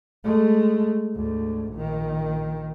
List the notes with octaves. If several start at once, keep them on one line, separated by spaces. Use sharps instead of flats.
G#3 A3
D2 G#2
A#1 D#3